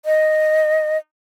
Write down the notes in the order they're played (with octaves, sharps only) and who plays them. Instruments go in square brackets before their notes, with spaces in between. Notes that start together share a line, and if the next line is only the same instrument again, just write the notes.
[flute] D#5